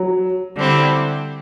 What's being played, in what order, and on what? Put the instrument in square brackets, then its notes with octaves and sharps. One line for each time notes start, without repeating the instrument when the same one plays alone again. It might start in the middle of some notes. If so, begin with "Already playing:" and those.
Already playing: [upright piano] F#3
[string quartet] D3 G3 C4 E4